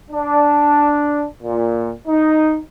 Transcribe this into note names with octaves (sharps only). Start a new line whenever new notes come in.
D4
A#2
D#4